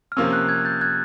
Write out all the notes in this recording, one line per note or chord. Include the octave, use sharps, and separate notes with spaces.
F6
C3 F3 A#3 C#4 E6
F#6
F#6 G#6
G6 A6
F#6 G#6